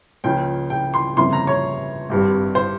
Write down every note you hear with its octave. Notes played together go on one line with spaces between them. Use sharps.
C#2 C#3 F3 A#3 C#4 G5
G5
C6
G1 F2 C#3 F3 A#3 C6
A#5
C#5
G#1 G2 G3 C4
C5